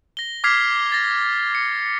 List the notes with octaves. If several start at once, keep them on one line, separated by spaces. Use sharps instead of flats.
A#6 G7
D6 F6 G#6 B6 C7 F7
A6 A#6
C#7